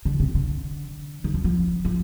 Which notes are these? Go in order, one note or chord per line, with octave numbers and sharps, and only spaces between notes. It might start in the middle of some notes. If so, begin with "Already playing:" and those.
D3
C3
D3
D#3
F3
F3
F3